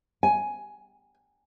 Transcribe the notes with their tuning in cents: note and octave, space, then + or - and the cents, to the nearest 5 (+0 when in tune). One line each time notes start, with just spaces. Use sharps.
G#5 +10